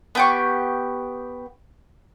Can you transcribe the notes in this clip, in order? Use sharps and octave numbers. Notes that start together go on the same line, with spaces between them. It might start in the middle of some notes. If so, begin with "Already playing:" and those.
B3 G4 C#6